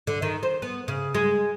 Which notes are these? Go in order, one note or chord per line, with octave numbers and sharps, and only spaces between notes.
D3
D#3
C5
B3
C#3
G#3